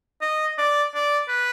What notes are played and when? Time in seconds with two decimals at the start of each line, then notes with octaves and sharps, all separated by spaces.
0.21 D#5
0.58 D5
0.94 D5
1.29 B4